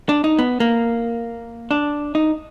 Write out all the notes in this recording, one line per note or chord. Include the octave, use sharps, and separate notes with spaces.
D4
D#4
B3
A#3
D4
D#4